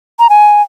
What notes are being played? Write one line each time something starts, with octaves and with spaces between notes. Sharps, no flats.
A#5
G#5